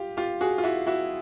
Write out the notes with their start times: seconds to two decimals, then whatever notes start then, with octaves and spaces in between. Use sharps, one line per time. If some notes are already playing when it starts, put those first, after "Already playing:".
Already playing: F4 G4
0.17 F4 G4
0.41 F#4 G#4
0.58 F4
0.63 E4 F#4
0.87 E4 F#4